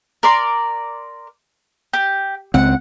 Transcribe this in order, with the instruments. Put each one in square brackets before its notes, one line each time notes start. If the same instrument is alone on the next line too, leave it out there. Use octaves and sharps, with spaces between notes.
[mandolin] A#4 D5 C6
G4
[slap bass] C#2 C4 [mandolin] F#5